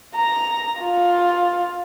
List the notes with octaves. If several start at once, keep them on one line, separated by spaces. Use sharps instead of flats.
A#5
F4